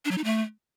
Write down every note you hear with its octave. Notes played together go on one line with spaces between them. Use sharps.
D4
F#3
D#4
A3